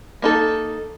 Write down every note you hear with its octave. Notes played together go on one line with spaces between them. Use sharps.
A#3 D#4 A4